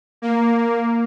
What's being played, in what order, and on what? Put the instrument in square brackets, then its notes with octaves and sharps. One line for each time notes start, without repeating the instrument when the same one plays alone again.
[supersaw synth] A#3